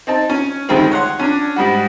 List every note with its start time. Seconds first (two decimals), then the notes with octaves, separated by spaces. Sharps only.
0.07 C4 D#4 A5
0.29 C#4
0.69 D2 D#3 G3 G#3 C4
0.91 C#5 F#5 C6
1.19 C#4 D4
1.56 G#2 G3 F#4